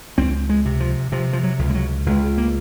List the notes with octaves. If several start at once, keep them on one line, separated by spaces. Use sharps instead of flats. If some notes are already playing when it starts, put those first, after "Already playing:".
C#2 C4
G#3
C3
F3
C3 F3
F3
F#3
C#2
G#3
F#3
C#2 G#3
A#3